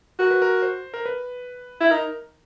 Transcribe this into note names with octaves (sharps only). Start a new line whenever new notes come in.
F#4 A#4
B4
A#4
C5
A#4
B4
E4
D#4 A#4